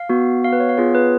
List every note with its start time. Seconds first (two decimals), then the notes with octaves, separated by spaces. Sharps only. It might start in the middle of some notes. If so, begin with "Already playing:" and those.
Already playing: F5
0.09 B3 F#4
0.44 F5
0.53 B4
0.60 C#5
0.69 F5
0.78 B3 F4 G#4 C#5
0.95 B4